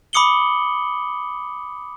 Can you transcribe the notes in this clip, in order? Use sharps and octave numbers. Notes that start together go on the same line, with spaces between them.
B5 D6 D#6 C#7 F#7 G7